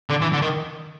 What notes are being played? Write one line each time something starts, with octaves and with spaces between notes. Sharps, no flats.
D3
E3
D3
D#3